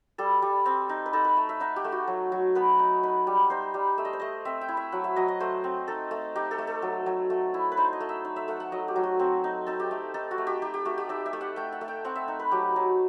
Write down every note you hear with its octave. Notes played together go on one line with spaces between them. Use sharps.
G3 A4
G3
C4
D#4
B4
D#4 A4
B4
A3
E5
D#4 F#5
G4
A3
F#4
F#3
F#3
B3 B4
D#4
D#4 B4
G3
D#4 C5
G3
A3 E5
D#5
C5
A3 D#5
C4 E5
G5
E4
E5
F#3 F#5
E5
F#3 D#5
D#5
A3 C5
C4
D#4 A4
A3
D#4 G4
A4
A3
A4
F#3
F#3
A3
E4
B4
D#4 C5
D#5
A3
E5
D#4
E5
A3 F#5
F#5
F#3 D#5
G4
F#3
F#4
C4
D#4
D#4 A4
G4
A3
D#4 A4
F#4
A3
G4
D#4 G4
G4
A3 F#4
G4
D#4 E5
E5
A3
F#5
A3 G5
F#5
A3
G5
C4 F#5
E5
D#4
B4
F#3 G4
F#3